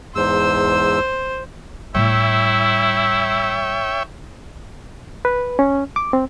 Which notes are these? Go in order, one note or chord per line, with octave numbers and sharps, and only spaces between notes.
E2 G#2 C5 E6
A2 G3 E4 C#5 E5 G5
B4
C#4
D6
C4